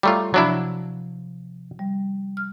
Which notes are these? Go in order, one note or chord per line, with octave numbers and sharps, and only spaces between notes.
G3 A3 F4 C#5 A#5 D6
C3 F3 F#3 D4 E4
G3
F6